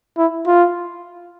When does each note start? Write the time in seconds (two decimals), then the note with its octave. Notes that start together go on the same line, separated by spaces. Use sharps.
0.18 E4
0.47 F4